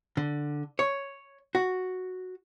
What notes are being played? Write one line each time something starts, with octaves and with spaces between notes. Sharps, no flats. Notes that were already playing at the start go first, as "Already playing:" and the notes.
D3
C#5
F#4